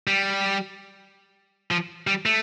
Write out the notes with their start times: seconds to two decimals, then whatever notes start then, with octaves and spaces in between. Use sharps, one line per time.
0.07 G3
1.71 F3
2.07 G3
2.26 A3